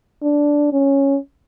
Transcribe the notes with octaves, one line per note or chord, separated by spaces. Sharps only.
D4
C#4